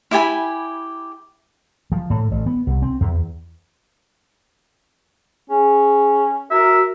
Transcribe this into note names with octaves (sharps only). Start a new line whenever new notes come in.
E4 G4 G#5 B5
F3
A2
A1
B3
C2
C4
E2
C#4 G#4
F#4 A#4 E5